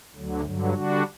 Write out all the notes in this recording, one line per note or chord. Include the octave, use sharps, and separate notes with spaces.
D2 D3 F#3
G2 D3 F#3
D3 G3 D4 F#4